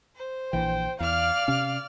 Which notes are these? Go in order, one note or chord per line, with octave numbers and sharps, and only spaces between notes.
C5
A#1 E3 G5
E2 D5 F5 F6
C3 C#4